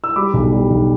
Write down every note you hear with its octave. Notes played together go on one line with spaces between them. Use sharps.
E6
G3 B5 D6
B1
G3
B1